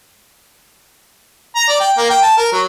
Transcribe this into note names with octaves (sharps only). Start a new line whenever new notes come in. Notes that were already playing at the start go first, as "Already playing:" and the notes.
A#5
D5
G5
A#3
G5
A5
A#4
F#3